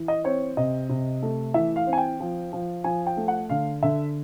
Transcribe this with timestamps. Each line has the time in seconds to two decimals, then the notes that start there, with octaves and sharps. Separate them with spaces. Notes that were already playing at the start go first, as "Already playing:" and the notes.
Already playing: E3
0.08 D#5
0.24 C4 C#5
0.57 C3 D#5
0.89 C3
1.22 A3
1.54 E3 E5
1.76 F5
1.87 C4
1.93 G#5
1.98 G5
2.20 F3
2.53 F3
2.84 F3 G#5
3.07 G5
3.17 A3
3.28 F#5
3.49 D3 F5
3.83 D3 E5